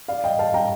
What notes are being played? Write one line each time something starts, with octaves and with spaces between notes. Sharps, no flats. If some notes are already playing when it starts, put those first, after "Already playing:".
D5 F5
D#5 G5
F5 A5
G5 A#5